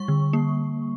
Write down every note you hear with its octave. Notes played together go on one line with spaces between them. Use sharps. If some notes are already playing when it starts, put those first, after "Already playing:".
Already playing: G3 C#6
D3
A#3